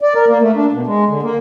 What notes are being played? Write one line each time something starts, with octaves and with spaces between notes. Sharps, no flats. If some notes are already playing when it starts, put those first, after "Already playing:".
D5
A#4
A#3
A3
D4
B2
G#3
D3
A#3